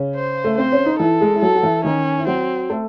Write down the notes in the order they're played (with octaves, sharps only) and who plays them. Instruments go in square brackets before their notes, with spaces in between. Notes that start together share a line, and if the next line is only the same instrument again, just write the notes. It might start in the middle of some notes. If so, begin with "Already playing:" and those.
Already playing: [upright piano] C#3 C#4
[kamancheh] C5
[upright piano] A3
[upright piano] C4 [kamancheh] C5
[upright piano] C#4
D#4
[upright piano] E3 E4 [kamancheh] A4
[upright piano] G#3 G#4
E4
[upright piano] F#3 F#4 [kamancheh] A4
[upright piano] F#4
E3 E4
[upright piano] D#3 D#4 [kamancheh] C#4
[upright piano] E4
[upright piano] F#3 F#4 [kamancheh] C4
[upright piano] A3 A4